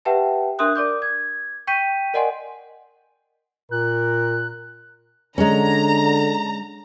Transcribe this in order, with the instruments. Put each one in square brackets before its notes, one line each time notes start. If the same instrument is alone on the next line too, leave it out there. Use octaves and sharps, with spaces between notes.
[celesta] G4 B4 E5 F#5 G5 A5
D4 A#4 E5 C6 D#6 F#6
A#4 D5 D6 G6
G#6
G5 C#6 G6 B6 D#7
A#4 D5 D#5 F#5 G#5 C6
[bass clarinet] A#2 [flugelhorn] A#4 [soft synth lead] F#6
[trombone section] D3 [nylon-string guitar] G#3 C#4 [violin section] A#5